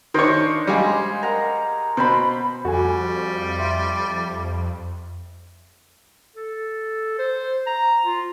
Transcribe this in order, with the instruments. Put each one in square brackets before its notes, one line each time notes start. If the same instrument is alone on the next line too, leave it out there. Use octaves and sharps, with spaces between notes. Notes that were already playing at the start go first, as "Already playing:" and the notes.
[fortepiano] D#3 C#5 [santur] D4 C5
[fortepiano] G3 G#3 [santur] D#5 F5 G#5
[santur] A#4 F#5 A#5
[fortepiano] B2 [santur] C5 B5
[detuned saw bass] F2 [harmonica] G3 [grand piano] F#4 A4 G#5
[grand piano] E5 C6
[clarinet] A4
C5
A#5
F4